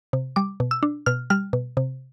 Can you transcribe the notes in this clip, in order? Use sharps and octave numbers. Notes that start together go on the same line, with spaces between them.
C3
G3 D6
B2
E6
D4
B2 F6
G3 F6
B2
C3